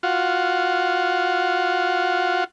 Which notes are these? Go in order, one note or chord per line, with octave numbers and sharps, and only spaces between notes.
F4 F#4